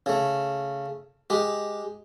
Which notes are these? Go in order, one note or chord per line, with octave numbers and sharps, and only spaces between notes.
C#3 A3
G#3 G4